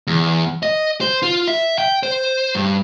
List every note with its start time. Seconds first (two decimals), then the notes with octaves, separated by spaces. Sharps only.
0.07 E2
0.63 D#5
1.01 C5
1.22 F4
1.48 E5
1.78 G5
2.03 C5
2.55 G2